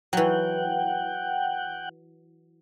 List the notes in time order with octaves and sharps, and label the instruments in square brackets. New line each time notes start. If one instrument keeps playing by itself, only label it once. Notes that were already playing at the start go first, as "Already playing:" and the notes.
[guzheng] E3 F#3 [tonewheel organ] F#5 G5